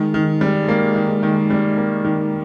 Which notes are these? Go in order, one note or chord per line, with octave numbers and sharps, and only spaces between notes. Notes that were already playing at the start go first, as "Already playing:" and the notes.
Already playing: D#3 G#3
D#3
G3
A#3
D#3
D#3
G3
A#3
D#3